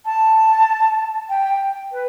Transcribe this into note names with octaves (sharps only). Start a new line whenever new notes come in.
A5
G5
B4